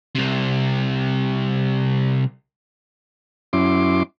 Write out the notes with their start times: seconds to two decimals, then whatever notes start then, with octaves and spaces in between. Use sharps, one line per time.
0.15 C2 C3
3.53 F#2 C#4 E4 C6 D6